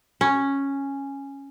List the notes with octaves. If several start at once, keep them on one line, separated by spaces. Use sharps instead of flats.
C#4